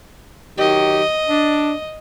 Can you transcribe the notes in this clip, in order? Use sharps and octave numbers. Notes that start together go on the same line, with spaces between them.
D#3 F#3 G4 D#5
D4